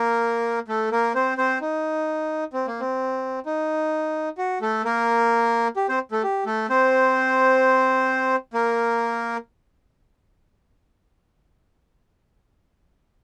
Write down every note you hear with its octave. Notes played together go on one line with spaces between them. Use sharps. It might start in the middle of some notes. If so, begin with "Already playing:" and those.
Already playing: A#3 A#4
A3 A4
A#3 A#4
C4 C5
C4 C5
D#4
C4
A#3
C4
D#4
F#4
A3 A4
A#3 A#4
G4
C4 C5
A3 A4
G4
A3 A4
C4 C5
A#3 A#4